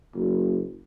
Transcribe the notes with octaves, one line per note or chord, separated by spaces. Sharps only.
F#1